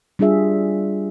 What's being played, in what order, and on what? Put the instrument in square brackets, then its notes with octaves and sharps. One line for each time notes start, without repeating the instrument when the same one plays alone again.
[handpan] G3 D4 F4 G#4 E5